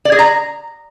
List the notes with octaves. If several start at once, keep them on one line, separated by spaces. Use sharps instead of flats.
D5
G#4
A#5